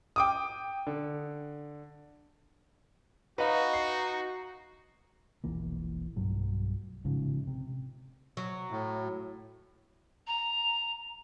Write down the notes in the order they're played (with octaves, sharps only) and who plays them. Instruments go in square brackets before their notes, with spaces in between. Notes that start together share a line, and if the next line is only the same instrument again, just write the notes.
[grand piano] G5 D6 D#6
D3
[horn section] D#4 F#4 [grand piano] B4 D#5 F5
[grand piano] C7
[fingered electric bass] E1 A#1 E3 A#3
B1 G2 F#3 A3
A1 G#2 C#3 F3
C3
[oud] F#3
[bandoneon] A2
[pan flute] A#5